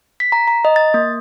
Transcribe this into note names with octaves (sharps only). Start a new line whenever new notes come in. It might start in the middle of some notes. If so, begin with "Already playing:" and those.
B6
A#5
A#5
D#5
A6
A#3